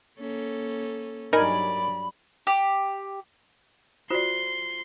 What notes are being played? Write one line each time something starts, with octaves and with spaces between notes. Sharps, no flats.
A#3 C#4 A4
G2 F#3 D#4 A#4 D5 G#5 B5
G4
F4 F#4 C5 D5 C6